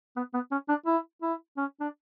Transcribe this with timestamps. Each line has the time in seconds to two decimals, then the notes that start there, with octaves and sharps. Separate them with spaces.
0.16 B3
0.34 B3
0.51 C#4
0.69 D4
0.86 E4
1.22 E4
1.58 C#4
1.80 D4